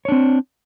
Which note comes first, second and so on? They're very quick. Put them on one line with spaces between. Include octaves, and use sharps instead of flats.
C#5 D4 C4